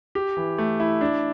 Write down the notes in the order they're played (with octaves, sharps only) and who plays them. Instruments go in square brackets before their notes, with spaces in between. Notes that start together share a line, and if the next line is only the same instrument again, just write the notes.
[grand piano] G4
E3
A3
E4
D4